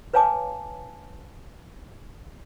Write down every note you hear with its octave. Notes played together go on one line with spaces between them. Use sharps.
B4 C#5 F5 G#5 A5 D6